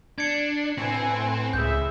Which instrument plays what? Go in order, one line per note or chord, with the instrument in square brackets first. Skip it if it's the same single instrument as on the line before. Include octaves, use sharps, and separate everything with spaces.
[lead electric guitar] D4 [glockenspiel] G#6 C#7
[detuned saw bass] A2 [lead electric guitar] C4 [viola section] B4 G#5
[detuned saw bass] C#2 [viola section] E4 G#4 E5 [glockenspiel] G6